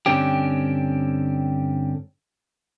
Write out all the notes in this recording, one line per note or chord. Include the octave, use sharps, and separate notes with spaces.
G2 D3 C4 C#4 G4